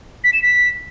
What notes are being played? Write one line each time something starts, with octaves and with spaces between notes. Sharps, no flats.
B6
E7
B6